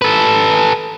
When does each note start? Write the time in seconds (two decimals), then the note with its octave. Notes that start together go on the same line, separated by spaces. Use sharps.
0.02 A4 B4